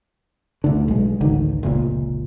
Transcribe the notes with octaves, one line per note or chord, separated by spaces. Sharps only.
D2 D3
B1 G#3
A1 D2 D3 D#3
F1 C#2 A#2